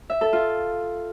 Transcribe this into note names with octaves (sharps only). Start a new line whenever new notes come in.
E5
A4
F4